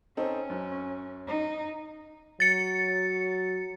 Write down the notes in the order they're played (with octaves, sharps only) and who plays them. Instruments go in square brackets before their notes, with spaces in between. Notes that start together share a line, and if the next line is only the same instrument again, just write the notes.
[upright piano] C4 D#4 A4 [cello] C#4
[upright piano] F#2
[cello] D#4
[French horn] F#3 [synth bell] A6 C#7